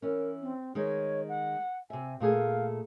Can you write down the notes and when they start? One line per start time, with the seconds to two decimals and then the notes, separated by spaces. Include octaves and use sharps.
0.02 E3 C#4 A#4
0.41 C4
0.75 D#3 G#3 D#4 C#5
1.28 F#5
1.90 C3 E5 G#5
2.20 A#2 A3 G#4 F5